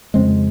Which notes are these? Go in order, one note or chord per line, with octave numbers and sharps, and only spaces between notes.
F2 C#3 G#3 C4